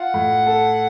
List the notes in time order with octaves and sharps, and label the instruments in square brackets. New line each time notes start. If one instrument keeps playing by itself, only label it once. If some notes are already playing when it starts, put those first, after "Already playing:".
Already playing: [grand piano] F4 [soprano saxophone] F#5
[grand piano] A2
A4